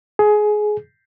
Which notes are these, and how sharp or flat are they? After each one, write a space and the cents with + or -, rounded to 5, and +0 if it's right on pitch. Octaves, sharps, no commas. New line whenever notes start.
G#4 +20